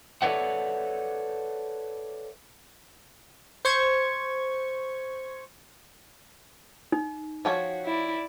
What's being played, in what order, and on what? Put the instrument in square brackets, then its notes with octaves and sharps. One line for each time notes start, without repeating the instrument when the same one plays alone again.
[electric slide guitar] A4 B4 C#5 D5 E5 F#5
[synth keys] C5 C#6 G#6
[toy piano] D#4
[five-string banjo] F3 G4 C#5 [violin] F#4
[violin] E4 D5